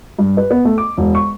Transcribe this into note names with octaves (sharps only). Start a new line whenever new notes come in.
G2
B4
B3
A3
D6
E1
C#6